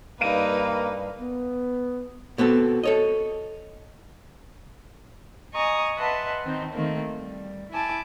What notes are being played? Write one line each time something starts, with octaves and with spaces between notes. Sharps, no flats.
G2 G3 A#3 D#4 B4 F5 D7 D#7
B3
B2 B3 C4 A4
A4 C#5 D#5
D#5 G#5 A#5 C#6 D#6
B4 D#5 E5 F#5 A5 C6
D#3 C4 D#4
D#3 A3 A#3 C4
G3
E4 G#5 A5 D6